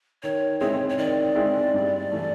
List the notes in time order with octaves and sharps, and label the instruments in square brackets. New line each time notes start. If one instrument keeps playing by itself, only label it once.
[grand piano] D#3 [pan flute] C#5
[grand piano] G#3 C4 E4 G#4 [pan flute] C#5
[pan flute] C#5
[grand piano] D#3 [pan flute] D5
[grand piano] G#3 C4 E4 G#4
G2
E3 A3